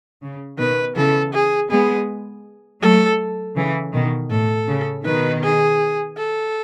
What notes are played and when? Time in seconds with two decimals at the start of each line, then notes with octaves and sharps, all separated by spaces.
0.22 C#3
0.59 B2 D#3 B4
0.96 C#3 E3 A4
1.34 G#4
1.70 G#3 B3 G#4
2.82 F#3 A3 A4
3.57 C#3 E3
3.94 B2 D#3
4.31 A2 A4
4.68 C#3
5.05 B2 D#3 B4
5.43 G#4
6.17 A4